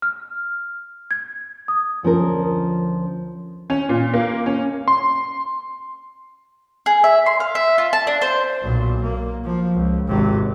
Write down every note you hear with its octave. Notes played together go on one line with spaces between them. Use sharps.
F6
G#6
D#6
D2 F3 C#4 A#4
C#4
A#2
A#3
C#4
C6
G#4
E5
C6
F5
E5
F4
A5
D4
C5
B1 A#2
A#3
F3
C#2
G#1 C3